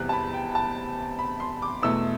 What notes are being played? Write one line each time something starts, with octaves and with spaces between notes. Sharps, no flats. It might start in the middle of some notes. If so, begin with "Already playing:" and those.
Already playing: E2 C3 G3 C4 F#6
A5
B5
G5
A5
B5
C6
D6
E2 B2 A3 E6